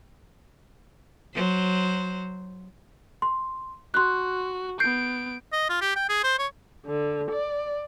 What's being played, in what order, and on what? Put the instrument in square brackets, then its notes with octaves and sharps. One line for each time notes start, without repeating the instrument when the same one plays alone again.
[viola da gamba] F#3 C5
[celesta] C6
[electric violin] F#4 [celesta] C6 F#6
[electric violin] B3 D7 [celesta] G6 C7
[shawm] D#5
F4
G4
G5
G#4
C5
C#5
[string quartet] D3
D5